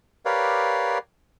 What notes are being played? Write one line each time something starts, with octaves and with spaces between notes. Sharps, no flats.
G4 A#4 B4 C#5 D5 F5